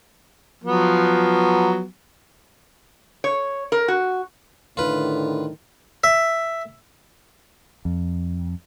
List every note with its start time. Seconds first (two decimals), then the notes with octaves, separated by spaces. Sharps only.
0.64 F3 F#3 B3
3.24 C#5
3.72 A#4
3.88 F#4
4.77 A2 D3 D#3 F4 B4
6.04 E5
7.85 F2